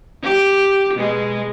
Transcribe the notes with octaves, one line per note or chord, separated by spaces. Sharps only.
G4
B2 G#3